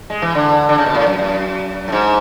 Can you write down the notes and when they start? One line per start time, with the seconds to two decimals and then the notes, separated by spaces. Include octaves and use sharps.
0.10 G#3
0.22 E3
0.35 D3
0.69 D3
0.78 C#3
0.86 B2
0.95 A2
1.07 F#2
1.19 F#2
1.88 A2
1.92 G#2